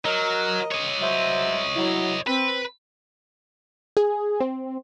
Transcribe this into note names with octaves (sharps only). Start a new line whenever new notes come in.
F#3 A#4 D#5
C#5 D#5
F#3 C5 E5
F#3 E4
C4 B4
G#4
C4